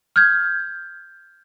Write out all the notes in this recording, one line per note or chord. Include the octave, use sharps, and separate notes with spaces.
F6 G6 G#6